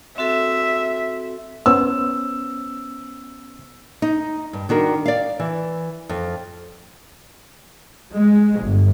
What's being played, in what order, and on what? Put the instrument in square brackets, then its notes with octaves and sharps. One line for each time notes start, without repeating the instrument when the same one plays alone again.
[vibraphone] C4 F#4 A4 [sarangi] E5
[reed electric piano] B3 C#4 C5 [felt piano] E6
[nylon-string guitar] D#4
G2
D#3 D4 F#4 A#4
D5 F5
E3
F2
[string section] G#3
G1